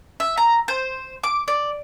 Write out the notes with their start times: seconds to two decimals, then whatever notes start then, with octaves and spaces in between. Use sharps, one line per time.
0.20 E5
0.37 A#5
0.68 C5
1.24 D6
1.48 D5